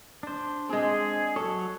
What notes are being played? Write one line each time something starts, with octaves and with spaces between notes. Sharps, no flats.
D4 C5
G#3 C4 G#4
F#3 A4 C#5